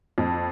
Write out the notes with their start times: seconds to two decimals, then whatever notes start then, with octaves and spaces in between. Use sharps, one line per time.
0.18 F2